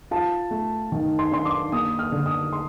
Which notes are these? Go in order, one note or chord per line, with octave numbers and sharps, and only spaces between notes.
F4 A5
A3
D#3
C6
D4 C6
D6
A#3 D#6
F6
D3
D#6
C6